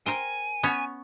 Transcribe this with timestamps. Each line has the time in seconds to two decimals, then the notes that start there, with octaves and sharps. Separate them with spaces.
0.06 A#4 C5 G5 G#5
0.63 B3 C#4 C#5